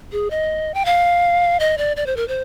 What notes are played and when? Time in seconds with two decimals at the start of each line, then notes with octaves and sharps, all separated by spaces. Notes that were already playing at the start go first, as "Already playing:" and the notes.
0.12 G#4
0.31 D#5
0.74 G5
0.85 F5
1.60 D#5
1.78 D5
1.96 D5
2.06 C5
2.17 A#4
2.28 C5